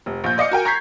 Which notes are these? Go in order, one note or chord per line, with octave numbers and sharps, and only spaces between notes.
F1
A#1 G6
D5 D#5 F5 D6 C#7
F#4 A#4 G5 G#5
A#5 C#6 G6 G#6 B6 C7